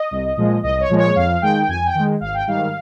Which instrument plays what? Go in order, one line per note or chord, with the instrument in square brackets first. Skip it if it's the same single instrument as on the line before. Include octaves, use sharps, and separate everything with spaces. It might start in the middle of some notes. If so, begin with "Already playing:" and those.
Already playing: [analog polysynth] D#5
C2
A#2 F3 G#3
C2 D#5
C#5
A#2 F3 G#3
C#5
F2 F5
D#3 G#3 G5
F2 G#5
G5
D#3 G#3
G#1 F5
G5
G#2 D#3 G3 F5